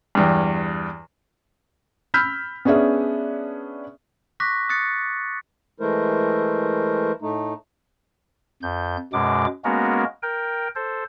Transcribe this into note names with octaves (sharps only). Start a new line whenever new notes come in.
E2 G2
B5 E6 F6 G6 B6
B3 C#4 D4 G#4 E5
C#6 D6 F#6 A#6 B6
D#6 F#6 A6 C#7
E3 G#3 A3 E4 A#4 C5
A2 A3 D#4
F2 G6
F#2 B2 G#3 D6
G#3 A#3 B3 C#4 F#4 A#4
A#4 G5
A4 C5